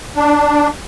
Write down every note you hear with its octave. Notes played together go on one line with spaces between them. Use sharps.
D4